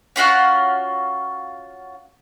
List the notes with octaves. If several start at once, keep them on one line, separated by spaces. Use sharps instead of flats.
C#4 F4 F#4 F#5